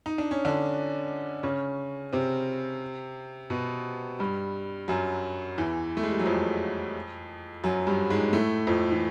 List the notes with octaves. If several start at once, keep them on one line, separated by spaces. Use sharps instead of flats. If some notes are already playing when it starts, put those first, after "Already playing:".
D#4
D4
C#4
D3 D4
C#3 C#4
C3 C4
B2 B3
G2 G3
F#2 F#3
E2 E3
A3
G#3
G3
F#3
F2 F3
F#2 F#3
G2 G3
G#2 G#3
A2 A3
F2 F3
E3